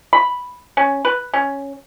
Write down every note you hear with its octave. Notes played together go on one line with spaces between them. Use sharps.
B5
C#4
B4
C#4